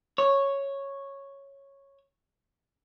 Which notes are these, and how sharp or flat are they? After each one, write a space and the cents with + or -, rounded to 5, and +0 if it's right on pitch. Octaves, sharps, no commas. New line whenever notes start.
C#5 -5